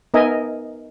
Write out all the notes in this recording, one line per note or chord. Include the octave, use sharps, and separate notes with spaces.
B3 D#4 A#4 D#5 E5 G#5